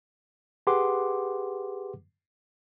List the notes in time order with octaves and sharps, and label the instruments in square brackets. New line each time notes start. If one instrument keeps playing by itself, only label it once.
[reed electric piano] G4 G#4 B4 F#5 C6 D6